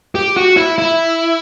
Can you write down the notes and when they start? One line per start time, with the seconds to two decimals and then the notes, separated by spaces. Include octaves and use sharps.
0.15 G4
0.37 F#4
0.57 E4
0.78 E4